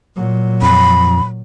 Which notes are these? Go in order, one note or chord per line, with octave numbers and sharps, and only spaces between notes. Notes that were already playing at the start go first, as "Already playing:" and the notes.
A#2 F#3
F2 B5